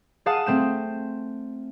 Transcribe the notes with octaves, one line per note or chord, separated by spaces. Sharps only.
G#4 F5 F#5 A5 D#6 F#6
A3 C4 G6 E7